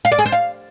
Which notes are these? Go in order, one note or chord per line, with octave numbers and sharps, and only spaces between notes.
F5
D5
G#4
C5
F5